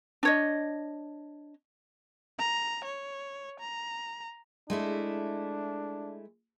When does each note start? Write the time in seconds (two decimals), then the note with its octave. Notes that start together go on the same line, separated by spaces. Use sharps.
0.23 D4 C#5 D#5
2.39 A#5
2.84 C#5
3.60 A#5
4.70 G#3 A3 D4 E4